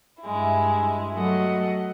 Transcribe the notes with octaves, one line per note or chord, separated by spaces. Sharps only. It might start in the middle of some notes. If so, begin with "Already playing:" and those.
G2 G#3 E4
F#3 A3 A4 D#5 F#5